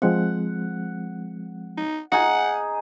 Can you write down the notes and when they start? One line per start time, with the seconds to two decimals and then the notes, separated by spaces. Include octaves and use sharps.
0.02 F3 G#3 C4 F#5
1.78 D#4
2.12 D#4 G#4 F#5